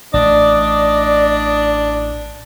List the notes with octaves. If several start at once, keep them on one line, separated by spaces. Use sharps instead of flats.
A1 A3 D4 D5 D#5